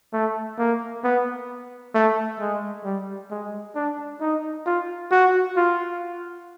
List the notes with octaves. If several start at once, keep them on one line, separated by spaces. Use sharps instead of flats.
A3
A#3
B3
A3
G#3
G3
G#3
D4
D#4
F4
F#4
F4